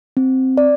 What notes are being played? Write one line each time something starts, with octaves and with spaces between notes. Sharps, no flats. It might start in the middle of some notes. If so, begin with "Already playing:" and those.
C4
D5